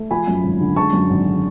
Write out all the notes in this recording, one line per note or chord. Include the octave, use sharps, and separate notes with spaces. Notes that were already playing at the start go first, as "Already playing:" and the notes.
Already playing: A3
F3 G#5 B5
F#2
G#1
D3
G#3 A5 C#6
F#2
G#1
D3